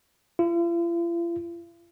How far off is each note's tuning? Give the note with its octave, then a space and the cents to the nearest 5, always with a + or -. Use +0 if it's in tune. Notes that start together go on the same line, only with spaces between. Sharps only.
F4 -45